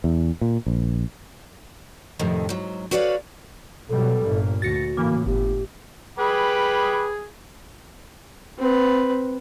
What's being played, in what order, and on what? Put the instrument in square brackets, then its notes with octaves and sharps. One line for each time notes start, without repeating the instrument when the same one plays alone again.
[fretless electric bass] E2
A#2
A#1
[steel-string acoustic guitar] F2 A2 C3 D#3
G#2 F#3
F#4 B4 C#5 D5 E5 F5
[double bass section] B2 F#3 G3 [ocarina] A4
[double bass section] G1 A#2
[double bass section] D2 [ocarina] F#4 [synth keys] A6 A#6 C#7
[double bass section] A2 [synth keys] C#3 E3 A#3
[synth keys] G1 [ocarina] G4
[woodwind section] G#4 [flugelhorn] B4 [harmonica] G5 B5 D6
[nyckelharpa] C4 B4